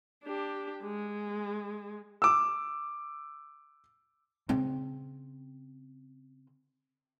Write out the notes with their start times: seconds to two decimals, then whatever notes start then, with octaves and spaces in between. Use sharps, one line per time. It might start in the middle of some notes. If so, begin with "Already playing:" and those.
0.24 D4 G4
0.83 G#3
2.22 D6 E6
4.49 C#3 C4